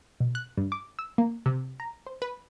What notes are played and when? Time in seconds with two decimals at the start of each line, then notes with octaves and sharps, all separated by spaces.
0.20 B2
0.35 F#6
0.57 G2
0.72 D6
0.99 E6
1.18 A#3
1.46 C3
1.80 A#5
2.06 C5
2.22 B4